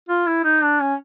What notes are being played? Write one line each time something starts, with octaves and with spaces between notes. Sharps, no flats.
F4
E4
D#4
D4
C#4